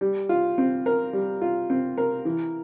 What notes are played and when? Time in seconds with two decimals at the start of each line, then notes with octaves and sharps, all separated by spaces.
0.01 G3
0.29 F4
0.58 C4
0.86 A#4
1.13 G3
1.42 F4
1.70 C4
1.98 A#4
2.25 E3